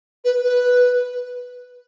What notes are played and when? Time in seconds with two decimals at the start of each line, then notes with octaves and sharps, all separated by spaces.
0.25 B4
0.42 B4